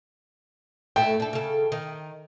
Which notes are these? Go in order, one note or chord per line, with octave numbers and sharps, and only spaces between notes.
A2 A3 G5
D4 A4
C#3 A4
D#3